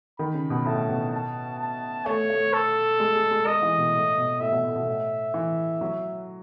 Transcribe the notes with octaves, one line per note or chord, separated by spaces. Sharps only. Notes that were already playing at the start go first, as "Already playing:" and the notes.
D#3 B5
C#3
B2
A2 A5
B2
A5
A5
A3 C#5
A3
A4
G#3
G#3
G#3
G#3 D#5
E3
B2
A2
B2
A2 E5
B2
A2
B2
A2
E3
F#3